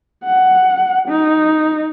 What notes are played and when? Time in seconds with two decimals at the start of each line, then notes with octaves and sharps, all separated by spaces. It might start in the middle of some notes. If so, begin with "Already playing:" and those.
0.24 F#5
1.08 D#4